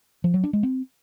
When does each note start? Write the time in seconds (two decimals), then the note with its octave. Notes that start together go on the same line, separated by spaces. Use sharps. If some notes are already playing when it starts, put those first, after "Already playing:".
0.24 F3
0.34 F#3
0.44 D4
0.53 G#3
0.63 C4